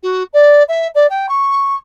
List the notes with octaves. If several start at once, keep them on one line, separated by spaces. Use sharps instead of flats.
F#4
D5
E5
D5
G5
C#6